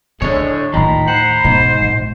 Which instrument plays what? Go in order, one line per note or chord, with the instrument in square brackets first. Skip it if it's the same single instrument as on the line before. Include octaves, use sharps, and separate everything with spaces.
[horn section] A2 G#3 [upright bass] D3 [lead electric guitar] D4 C#5
[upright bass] D#2 A2 [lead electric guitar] D#3 F3 [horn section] A#5 B5
[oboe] C5 [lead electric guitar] F#5
[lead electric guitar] G#2 [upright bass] B2
[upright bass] D1 A#1